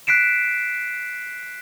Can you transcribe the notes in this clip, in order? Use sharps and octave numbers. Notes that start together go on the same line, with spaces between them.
F#6 B6 C7 D7 E7